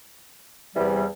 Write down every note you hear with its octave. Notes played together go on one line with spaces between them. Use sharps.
E2 C3 E3 G3